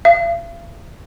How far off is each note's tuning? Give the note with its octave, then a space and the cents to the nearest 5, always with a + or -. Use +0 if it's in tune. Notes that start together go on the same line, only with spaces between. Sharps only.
F5 -45